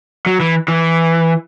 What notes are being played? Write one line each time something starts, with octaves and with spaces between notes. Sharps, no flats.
F#3
E3
E3